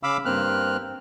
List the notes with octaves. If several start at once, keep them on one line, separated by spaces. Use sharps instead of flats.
C#3 F5 B5 D6 E6
G2 A#3 C4 F6 F#6